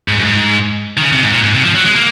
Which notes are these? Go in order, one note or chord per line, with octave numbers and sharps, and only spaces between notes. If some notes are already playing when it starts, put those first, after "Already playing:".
G#2
F#2
G#2
D#3
C#3
C3
G#2
A#2
G#2
C3
F3
F#3
G#3
A#3